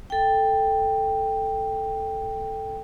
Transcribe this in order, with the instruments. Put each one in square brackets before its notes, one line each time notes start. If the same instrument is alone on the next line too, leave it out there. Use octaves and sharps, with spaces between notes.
[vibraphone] A4 G5